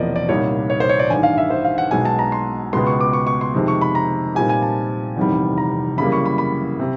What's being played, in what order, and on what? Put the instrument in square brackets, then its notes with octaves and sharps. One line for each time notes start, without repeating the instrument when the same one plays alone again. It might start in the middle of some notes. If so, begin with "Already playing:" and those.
Already playing: [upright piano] E1 E2 C3 F3 A#3 [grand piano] D5 D#5
[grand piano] D5
[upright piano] C2 A#2 G3 A#3 D#4 [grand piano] C#5
[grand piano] C#5
C5
C#5
D5
[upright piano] A1 G2 D#3 [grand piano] G#5
[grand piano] F5
E5
C5
F5
F#5
[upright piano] B1 B2 G#3 [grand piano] G#5
[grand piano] A5
A#5
C6
[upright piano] C#2 B2 G#3 B3 [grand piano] C6
[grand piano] C#6
D6
C#6
C#6
C6
[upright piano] F2 C3 D#3 G#3
[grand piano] C#6
B5
A#5
[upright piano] A#2 G3 C4 D#4 G4 [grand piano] G#5
[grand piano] G#5
A5
[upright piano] F1 E2 C3 D#3 G3
[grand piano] A#5
[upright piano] F#2 C#3 E3 G3 A#3 [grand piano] B5
[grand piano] C#6
B5
B5
[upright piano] C3